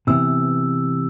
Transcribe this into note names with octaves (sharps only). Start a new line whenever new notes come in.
C3 E3 B3 E6